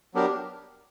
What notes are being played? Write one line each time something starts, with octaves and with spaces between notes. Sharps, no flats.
F#3 B3 D4 G4 A#4